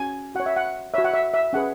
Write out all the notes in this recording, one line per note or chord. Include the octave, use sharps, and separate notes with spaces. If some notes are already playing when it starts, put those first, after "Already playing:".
Already playing: C#4 F#4 G#5
F#4 C#5 F#5
E5
F#5
F#4 C#5 E5
F#5
E5
E5
C#4 G#4 B4 F#5